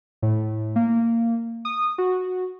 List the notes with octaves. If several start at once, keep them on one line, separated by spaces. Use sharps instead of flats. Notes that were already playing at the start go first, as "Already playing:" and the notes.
A2
A#3
D#6
F#4